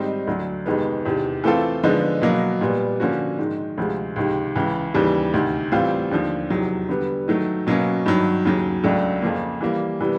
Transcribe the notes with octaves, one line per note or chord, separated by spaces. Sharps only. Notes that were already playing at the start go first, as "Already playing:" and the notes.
Already playing: G#2 D#3 G3 C4 D#4
D2 D3 F#3
F2 C3 D#3 G#3 B3
E2 C3 D#3
E3 A3 C4 F4 A4
D3 F3 G#3 B3 D#4
B2 F#3 A#3
A#2 G3 B3
D3 F3 A#3 C#4 F#4
G#2 D#3 G#3
D2 C3 F3 G#3
C#2 C3 D#3
C#2 C#3 E3
D#2 C#3 E3 G3
D2 C3 D#3
A2 E3 G3 C4 F4
D#2 D3 F3
E2 C3 D#3 F#3
D3 G3 B3
D#3 F#3 A3
B2 F#3 A#3 C#4
G2 D#3 F#3
D#2 C#3 F#3
C#2 C#3 F#3 A3 D4
F2 C#3 F3 A#3
E3 G3 A#3
C3 E3 G3 B3